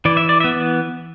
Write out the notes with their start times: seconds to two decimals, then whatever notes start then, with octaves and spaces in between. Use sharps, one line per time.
0.05 E3 D5
0.17 E5
0.29 D5
0.40 B3 E5